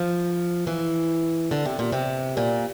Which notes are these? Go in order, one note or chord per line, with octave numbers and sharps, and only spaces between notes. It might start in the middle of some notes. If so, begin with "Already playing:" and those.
Already playing: F3
E3
D3
C3
A#2
C3
A#2